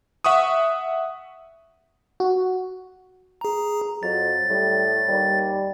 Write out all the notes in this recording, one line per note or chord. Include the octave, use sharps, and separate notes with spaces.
E5 F#5 C#6 D#6
F#4
G#4 A#5
F2 F#3 A6
A2 G3
D#2 G3